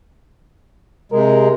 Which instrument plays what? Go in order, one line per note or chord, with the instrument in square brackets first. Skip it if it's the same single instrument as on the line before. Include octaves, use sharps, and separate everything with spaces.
[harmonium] C3 G#3 [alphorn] A#4